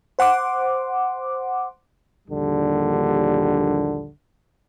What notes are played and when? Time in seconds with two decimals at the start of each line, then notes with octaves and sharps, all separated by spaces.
0.19 C5 F#5 C6 D6
2.28 A#1 D#2 D3 G3